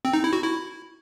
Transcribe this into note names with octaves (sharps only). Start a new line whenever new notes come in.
C4
D#4
E4
F#4
E4